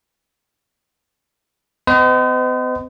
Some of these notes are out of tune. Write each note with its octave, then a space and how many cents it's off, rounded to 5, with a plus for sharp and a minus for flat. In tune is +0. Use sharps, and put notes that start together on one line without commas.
B3 +45 C5 -45 D#5 +0